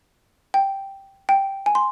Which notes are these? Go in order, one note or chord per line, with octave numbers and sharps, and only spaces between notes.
G5
G5
G#5
C6